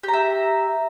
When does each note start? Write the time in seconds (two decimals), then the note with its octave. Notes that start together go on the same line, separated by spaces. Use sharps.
0.03 G4
0.08 A#5
0.13 E5